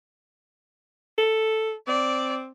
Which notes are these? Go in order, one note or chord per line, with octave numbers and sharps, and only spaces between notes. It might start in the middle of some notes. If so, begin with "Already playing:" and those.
A4
C4 D5